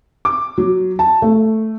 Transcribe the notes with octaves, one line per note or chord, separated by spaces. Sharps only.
D6
F#3
A5
A3